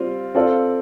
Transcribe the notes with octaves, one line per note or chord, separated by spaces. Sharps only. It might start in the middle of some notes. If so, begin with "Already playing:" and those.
Already playing: G3 C4 F4
C4 F4 A4 D5